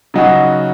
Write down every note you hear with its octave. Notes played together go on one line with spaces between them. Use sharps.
C#3 F#3 D#4 F#4